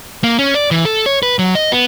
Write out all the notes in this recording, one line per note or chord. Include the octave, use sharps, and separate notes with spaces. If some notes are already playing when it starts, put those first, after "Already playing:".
A#3
C#4
D5
E3
A4
C#5
B4
F#3
D#5
B3